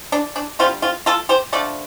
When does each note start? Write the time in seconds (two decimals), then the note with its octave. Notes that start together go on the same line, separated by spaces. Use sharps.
0.12 D4
0.36 D4
0.59 D3 C4 F4
0.63 G3
0.82 C4 F4
1.06 F4 A4
1.29 G4 C5
1.53 D3 F3 A3 A4 D5